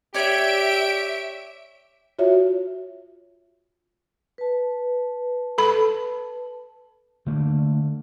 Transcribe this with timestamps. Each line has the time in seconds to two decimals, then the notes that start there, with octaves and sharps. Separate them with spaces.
0.14 G4 C#5 D5 E5 D7
2.19 F4 F#4 C#5 E5
4.38 B4 A5
5.58 A4 B5
7.26 D3 A3 A#3